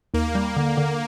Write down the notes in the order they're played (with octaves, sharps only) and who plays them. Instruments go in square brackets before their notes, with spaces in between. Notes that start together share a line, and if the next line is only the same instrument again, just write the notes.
[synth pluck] D#2 [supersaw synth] A#3
[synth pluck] G3
D3
D3